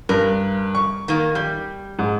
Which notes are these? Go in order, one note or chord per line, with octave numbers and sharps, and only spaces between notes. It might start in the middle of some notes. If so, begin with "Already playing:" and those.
G2 A#4
C#6
D#3 A#3
G3 G6
G#2